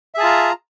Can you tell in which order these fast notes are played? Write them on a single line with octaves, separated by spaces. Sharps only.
E5 G#4 A5 F4 A#5